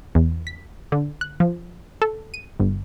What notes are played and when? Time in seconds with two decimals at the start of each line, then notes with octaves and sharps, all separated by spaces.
0.15 E2
0.47 B6
0.92 D3
1.21 F#6
1.40 F3
2.02 A4
2.34 D#7
2.60 G1